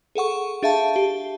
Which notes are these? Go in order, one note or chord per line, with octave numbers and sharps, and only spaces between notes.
G#4 A4 F#5 C#6
D4 G#4 E5 F5 A5
G4